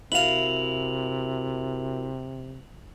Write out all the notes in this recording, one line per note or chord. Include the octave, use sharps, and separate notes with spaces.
C3 E4 F#4 A#4 F5 F7 F#7